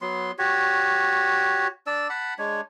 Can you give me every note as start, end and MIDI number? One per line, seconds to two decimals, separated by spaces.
0.01 0.32 54
0.01 0.32 59
0.01 0.32 84
0.38 1.68 66
0.38 1.68 67
0.38 1.68 73
1.87 2.08 62
1.87 2.08 74
1.87 2.08 88
2.10 2.34 78
2.10 2.34 81
2.10 2.34 83
2.38 2.61 56
2.38 2.61 62
2.38 2.61 73